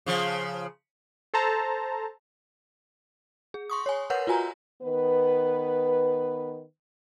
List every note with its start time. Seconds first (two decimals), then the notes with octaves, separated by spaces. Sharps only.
0.06 C#3 F3
1.34 A4 C5 A5 A#5
3.54 G#4
3.70 C6 C#6 D#6
3.86 C#5 G#5
4.10 A#4 B4 C#5 F#5 G6
4.27 F4 F#4 G#5 A#5
4.81 D#3 B3 B4